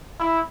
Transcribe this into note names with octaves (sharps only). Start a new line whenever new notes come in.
E4